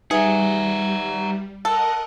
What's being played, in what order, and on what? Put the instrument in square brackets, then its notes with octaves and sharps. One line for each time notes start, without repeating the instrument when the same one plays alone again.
[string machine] G3 [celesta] D#4 B4 E5 [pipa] G#4 [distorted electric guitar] F#5 A#5
[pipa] A4 [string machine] A#4 D#5 F#5